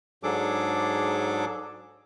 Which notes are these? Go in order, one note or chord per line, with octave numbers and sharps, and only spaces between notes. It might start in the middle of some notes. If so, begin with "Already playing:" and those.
G#2 F#3 D4 G#4 A4 D6